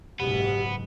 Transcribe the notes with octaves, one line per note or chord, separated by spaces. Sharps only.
F#1 B1 G#2 B3 G4